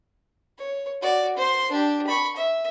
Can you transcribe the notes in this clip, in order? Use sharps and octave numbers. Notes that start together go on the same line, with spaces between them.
C#5
F#4 D5
C5 C6
D4 G4
B5 C#6
E5